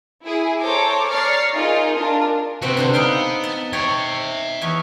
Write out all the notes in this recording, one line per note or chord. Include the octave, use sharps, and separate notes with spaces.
E4 G#4
A4 C5 C#5 A#5 D6
C#5 D5 A#5 F6 A6 C7
D#4 F4 G#4 A#4
D4 F4 A#4
C3 C4 F#4 G4 B4
D3 D4 C5
B3 D#4 F5 G5
A5
C#5 E5 G5
E2 C#5